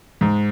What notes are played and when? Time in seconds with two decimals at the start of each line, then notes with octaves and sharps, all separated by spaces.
0.21 G#2